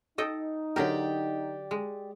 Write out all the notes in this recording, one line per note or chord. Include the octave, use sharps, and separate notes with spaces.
D#4 A4 D#5 G5
D3 F#3 G4 A#4 D5 G5
G#3